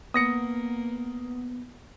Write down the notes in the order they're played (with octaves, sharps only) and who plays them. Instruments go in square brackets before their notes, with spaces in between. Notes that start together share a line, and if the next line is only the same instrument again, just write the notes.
[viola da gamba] A#3 [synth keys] B3 [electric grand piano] D#6 A#6 C#7